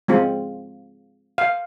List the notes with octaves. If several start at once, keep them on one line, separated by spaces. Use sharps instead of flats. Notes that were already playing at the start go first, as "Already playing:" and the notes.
G#3 C4 F4
F5